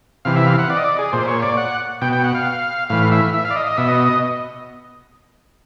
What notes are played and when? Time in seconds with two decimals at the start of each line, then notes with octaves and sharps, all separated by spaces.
0.25 C3 E3 F5
0.36 E5
0.46 F5
0.59 F#5
0.70 D5
0.77 D#5
0.84 D5
0.99 G#4
1.13 A#2 C5
1.28 C#5
1.42 D5
1.57 F#5
2.01 B2 G5
2.13 G5
2.24 F#5
2.35 F5
2.90 A2 E3 F5
3.12 E5
3.34 E5
3.45 F5
3.50 D5
3.56 D#5
3.67 D#5
3.77 B2 E5
3.88 D#5